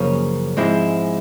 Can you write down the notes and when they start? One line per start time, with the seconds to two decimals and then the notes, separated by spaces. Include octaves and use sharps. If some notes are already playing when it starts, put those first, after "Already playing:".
Already playing: F#2 C#3 F3 A#3 C#4
0.57 G#2 F3 G#3 C4 E4